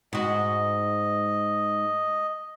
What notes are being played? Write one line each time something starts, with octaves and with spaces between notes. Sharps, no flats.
G#2 F#4 D#5